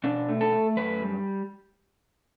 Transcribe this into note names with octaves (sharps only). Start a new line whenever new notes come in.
B2 D4
A3
A4
A3
F#2 B4
G3